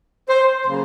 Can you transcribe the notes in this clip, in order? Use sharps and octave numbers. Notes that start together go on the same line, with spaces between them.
C5
C#3 F#3 A#3